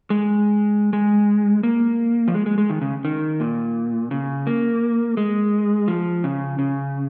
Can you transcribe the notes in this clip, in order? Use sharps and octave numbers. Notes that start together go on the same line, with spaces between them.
G#3
G#3
A#3
F3
G#3
G#3
G#3
D#3
C#3
D#3
A#2
C#3
A#3
G#3
F3
C#3
C#3